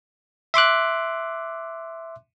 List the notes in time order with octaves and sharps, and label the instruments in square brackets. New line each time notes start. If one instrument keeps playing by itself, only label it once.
[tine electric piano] E5 C6 D6 F#6